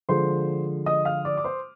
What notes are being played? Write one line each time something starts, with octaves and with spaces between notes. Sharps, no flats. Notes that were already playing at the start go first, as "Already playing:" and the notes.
D3 F3 G#3 C5 C6
D#5 D#6
F5 F6
D5 D6
D6
C5 C6